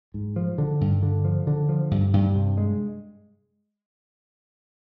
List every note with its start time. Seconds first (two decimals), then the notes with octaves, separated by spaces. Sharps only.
0.14 G#2
0.36 F3
0.58 D3
0.81 G2
1.03 D3
1.25 F3
1.47 D3
1.69 F3
1.91 G2
2.13 G2
2.35 C3
2.58 G#3